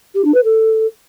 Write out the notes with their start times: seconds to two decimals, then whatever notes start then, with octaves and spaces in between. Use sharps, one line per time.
0.14 G4
0.24 D4
0.34 B4
0.44 A4